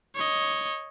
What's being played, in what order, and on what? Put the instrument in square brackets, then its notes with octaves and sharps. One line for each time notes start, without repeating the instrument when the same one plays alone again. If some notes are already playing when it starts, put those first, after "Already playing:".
[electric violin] C#5 D#5